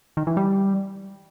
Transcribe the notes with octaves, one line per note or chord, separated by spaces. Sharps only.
D#3
E3
G3